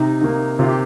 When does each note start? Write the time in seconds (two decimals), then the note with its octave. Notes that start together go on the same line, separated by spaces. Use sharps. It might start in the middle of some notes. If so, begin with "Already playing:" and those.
Already playing: C3 D#4
0.21 D#3 A#3
0.58 C3 F4
0.67 G4